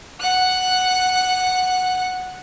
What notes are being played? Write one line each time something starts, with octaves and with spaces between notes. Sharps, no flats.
F#5 F#6